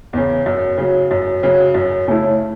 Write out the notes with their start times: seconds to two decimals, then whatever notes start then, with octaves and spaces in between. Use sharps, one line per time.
0.13 E2 C#3
0.46 F#2
0.78 C#3 F#3
1.11 F#2
1.43 C#3 F#3
1.74 F#2
2.07 C#3 A3 C#4 E4